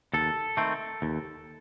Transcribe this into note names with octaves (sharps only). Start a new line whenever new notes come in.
D#2 A4
D#3 A3 C4
D#2